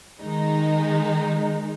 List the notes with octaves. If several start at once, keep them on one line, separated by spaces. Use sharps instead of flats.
D#3 G#3 D#4